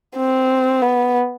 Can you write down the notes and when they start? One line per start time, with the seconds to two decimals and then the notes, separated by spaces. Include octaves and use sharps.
0.17 C4
0.82 B3